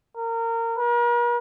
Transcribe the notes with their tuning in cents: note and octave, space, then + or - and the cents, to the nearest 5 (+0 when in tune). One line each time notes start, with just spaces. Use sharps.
A#4 -25
A#4 +45